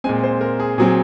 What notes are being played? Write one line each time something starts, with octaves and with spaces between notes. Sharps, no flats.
A#2 G#3 C4 G#5
C5
A#4
G#4
A#2 F#3 C4 G#4